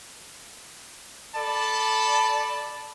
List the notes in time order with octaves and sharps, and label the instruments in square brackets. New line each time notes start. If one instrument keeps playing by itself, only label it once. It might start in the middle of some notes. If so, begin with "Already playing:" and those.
[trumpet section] A4 D5 A5 B5